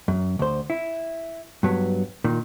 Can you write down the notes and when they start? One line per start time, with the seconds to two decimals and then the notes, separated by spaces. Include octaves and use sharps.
0.08 F#2
0.39 D2 C5
0.70 E4
1.63 G2 F#3 B3
2.24 A#2 D#3